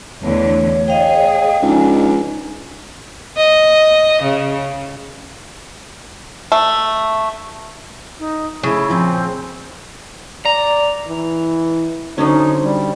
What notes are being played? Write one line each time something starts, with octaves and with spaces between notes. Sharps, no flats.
E2 D3 A3 C#5
G#4 D#5 F5 G5
C#2 F3 D4 D#4 G#5
D#5
C#3
A3
D#4
C#3 A3 E4
A#2 F3 C4
D5 A#5
E3
D3 F#3 C#4 D#4 C5
G3